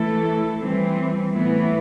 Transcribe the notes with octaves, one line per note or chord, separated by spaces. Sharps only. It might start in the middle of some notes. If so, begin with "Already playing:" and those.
Already playing: E3 A3 E4 A4
E3 G3 C4
A2 E3 B3 E4